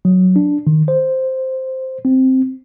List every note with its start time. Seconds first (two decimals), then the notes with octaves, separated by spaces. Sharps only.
0.05 F#3
0.36 D4
0.67 D#3
0.88 C5
2.05 C4